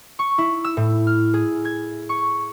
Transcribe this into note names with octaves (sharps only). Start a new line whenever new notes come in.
C#6
E4
E6
A2
F6
G#4
G#6
C#6